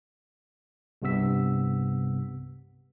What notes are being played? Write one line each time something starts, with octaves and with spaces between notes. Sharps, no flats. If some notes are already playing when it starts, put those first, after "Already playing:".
C2 G2 C3 B3 E6 B6